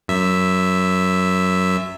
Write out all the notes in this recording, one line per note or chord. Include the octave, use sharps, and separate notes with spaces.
F#2 E5